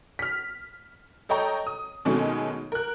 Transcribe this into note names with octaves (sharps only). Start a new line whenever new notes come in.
F6 B6
A4 C#5 D#5 G5 A#5
D#6
B2 D#3 F#3 G#3 A3 C#4
A#4 F#6